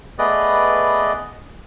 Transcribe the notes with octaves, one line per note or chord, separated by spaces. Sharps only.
A3 B3 G#4 B4 D5 D#5